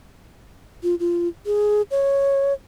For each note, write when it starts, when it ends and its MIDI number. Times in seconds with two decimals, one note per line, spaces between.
0.83 0.95 65
1.00 1.28 65
1.46 1.82 68
1.91 2.53 73